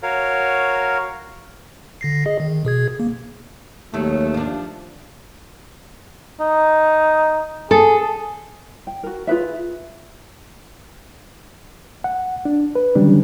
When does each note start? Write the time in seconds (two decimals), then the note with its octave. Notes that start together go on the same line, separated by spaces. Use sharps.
0.03 F#4 A#4 C#5 F5
2.01 D3 A#6 C7
2.26 G#4 D#5
2.40 D#3
2.65 B2 G#4 G#6
3.00 A#3
3.94 D#2 D#3 F#3 A3
4.34 F3 D4
6.41 D#4
7.71 G#4 A4
8.87 G5
9.03 F#4 A#4
9.27 F4 G#4 B4 E5
12.04 F#5
12.45 D4
12.75 B4
12.95 D3 D#3 F#3 G3 C#4 D4